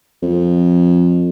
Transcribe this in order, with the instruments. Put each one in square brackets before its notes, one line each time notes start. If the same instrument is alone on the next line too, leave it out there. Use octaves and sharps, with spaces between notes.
[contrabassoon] F2